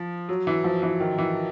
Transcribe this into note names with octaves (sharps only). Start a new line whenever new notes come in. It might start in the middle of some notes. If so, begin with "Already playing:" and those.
Already playing: F3
F#3
E3
F3
E3
D#3
E3